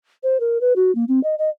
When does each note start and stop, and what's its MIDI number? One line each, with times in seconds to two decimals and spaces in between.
0.23 0.40 72
0.40 0.60 70
0.61 0.73 71
0.76 0.94 66
0.95 1.05 58
1.08 1.22 60
1.23 1.35 75
1.38 1.49 75